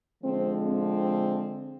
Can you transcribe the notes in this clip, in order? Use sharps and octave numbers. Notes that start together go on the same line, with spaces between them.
D3 F3 G#3 C4
C4